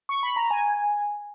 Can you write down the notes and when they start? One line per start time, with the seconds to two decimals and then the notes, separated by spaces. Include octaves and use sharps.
0.09 C#6
0.23 B5
0.36 A#5
0.50 G#5